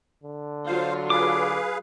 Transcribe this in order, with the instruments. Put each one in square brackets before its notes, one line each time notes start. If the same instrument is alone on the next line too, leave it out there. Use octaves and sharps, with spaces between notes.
[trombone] D3
[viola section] F#3 F4 [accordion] C5 F5
[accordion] G#4 B4 F5 [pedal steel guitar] D6